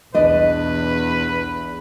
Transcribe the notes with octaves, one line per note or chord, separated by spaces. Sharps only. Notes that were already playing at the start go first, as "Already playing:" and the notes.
B1 E2 D4 B4 D#5